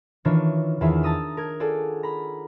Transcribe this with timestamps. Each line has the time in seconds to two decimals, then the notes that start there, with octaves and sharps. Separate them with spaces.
0.25 D#3 E3 D4 F4 C#5
0.81 E2 D#3 E4 F4 G#4 E5
1.03 A5 A#5 D#6 E6
1.37 A#4 G#6
1.60 F4 G#4 A4 D5 F#5
2.03 A#5 B5